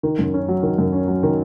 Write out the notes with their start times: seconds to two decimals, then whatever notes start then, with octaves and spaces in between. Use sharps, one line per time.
0.03 D#3
0.19 F#2
0.34 C#4
0.48 F#3
0.63 D#3
0.78 F#2
0.93 C#4
1.08 F#3
1.23 D#3